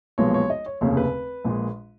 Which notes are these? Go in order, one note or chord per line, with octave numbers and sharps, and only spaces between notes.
B1 A#2 F3 G#3 B3 C#5
C#5
D#5
C#5
F1 D#2 C#3 C#5
B4
A#1 A#2 G#3